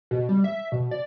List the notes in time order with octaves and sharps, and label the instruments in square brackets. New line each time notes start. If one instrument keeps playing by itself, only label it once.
[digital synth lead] B2
G3
E5
B2
D5